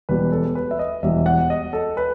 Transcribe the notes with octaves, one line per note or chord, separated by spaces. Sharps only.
E1 E2 B2 G3 B4
A4
B4
E5
D#5
E1 E2 B2 G3 E5
F#5
D#5
A4
B4